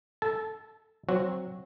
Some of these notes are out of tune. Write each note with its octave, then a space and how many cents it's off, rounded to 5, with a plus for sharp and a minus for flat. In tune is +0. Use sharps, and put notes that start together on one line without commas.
A4 +0 A5 -20
F#3 +0 C4 +0 F#4 -15